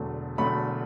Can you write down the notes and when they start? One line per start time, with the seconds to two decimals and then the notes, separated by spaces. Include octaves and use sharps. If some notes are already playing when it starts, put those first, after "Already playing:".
Already playing: E1 E2 D3 F#3 A3
0.38 E1 E2 D3 F#3 A3 B5